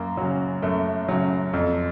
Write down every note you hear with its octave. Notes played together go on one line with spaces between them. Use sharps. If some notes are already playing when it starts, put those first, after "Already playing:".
Already playing: F#2 A#3
C#3 F#3
F#2 A3
C#3 F#3
F2